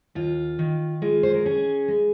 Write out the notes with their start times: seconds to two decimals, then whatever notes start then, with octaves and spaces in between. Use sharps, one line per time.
0.15 D#2 F4
0.59 D#3
1.02 G#3 F4
1.23 C5
1.34 A#4
1.45 C#4 G#4
1.88 G#3